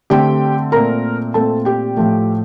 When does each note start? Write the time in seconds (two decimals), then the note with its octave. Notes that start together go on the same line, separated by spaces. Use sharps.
0.10 D3 A3 C4 G4 G5
0.72 A#2 A3 C4 A#4 A#5
1.34 A#2 A3 C4 A4 A5
1.65 G4 G5
1.97 A2 F3 A3